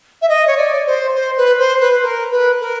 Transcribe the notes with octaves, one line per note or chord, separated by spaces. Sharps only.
E5
D#5
C#5
D5
C5
C5
B4
C5
B4
A#4
B4
A#4